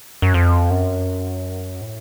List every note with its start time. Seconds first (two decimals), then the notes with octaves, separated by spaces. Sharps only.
0.22 F#2
0.34 F2
0.70 F#2
1.81 A2